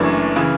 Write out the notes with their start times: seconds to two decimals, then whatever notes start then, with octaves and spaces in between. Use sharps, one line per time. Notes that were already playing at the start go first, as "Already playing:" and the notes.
Already playing: F#1 F#2 E3 A3 D4
0.36 C#3 E3